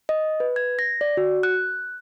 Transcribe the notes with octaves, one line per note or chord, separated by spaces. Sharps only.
D#5
B4
G#6
A#6
D5
F#4
F#6